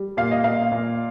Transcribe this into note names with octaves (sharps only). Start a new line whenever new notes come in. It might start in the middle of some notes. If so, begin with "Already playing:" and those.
Already playing: G3
A#2 F5
D#5
A#2 F5
A#2